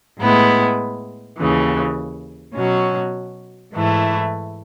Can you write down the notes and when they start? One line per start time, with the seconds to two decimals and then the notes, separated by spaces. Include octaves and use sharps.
0.20 A2 G#3 B3 E4
1.37 D#2 C#3 E3
2.55 B2 F#3 C#4
3.73 G#2 E3 A3 E4